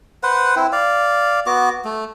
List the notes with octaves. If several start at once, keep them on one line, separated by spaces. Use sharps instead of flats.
B4 C5 F#5
C4 E4
D5 F5
B3 F#4 D6
A3